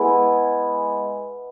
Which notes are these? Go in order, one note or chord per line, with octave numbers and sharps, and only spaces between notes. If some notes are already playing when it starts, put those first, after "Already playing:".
Already playing: G#3 B3 E4